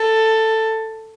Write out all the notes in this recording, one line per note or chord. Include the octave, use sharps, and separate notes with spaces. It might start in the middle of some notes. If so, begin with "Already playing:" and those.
Already playing: A4